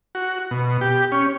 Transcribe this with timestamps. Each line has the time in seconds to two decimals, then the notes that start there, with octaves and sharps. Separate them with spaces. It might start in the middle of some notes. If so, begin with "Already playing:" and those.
0.15 F#4
0.51 B2
0.81 G4
1.12 C#4